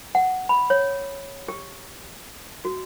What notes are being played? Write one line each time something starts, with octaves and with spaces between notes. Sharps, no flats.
F#5
B5
C#5
G4
F#4